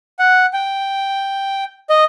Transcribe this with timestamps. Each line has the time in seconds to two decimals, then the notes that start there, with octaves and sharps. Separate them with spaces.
0.19 F#5
0.53 G5
1.90 D#5